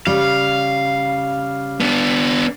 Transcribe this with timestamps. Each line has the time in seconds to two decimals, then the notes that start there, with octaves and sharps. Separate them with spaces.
0.07 C#3 G3 F5
1.81 B3 D4